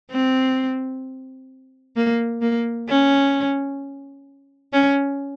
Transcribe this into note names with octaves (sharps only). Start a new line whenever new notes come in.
C4
A#3
A#3
C#4
C#4